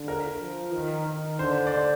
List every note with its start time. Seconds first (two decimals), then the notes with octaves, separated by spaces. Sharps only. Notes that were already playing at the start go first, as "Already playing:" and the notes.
Already playing: D3
0.08 A#4
0.41 F3
0.74 D#3
1.07 D#3
1.39 D3 C5
1.67 D5
1.72 C5